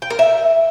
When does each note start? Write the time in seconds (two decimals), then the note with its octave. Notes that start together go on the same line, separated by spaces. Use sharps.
0.02 G5
0.10 A#4
0.19 E5